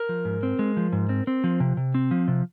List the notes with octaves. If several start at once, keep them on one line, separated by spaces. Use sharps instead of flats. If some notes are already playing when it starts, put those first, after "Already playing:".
Already playing: A#4
F3
G#2
C4
G#3
F3
G#2
C4
C4
F3
C3
C3
C4
F3
C3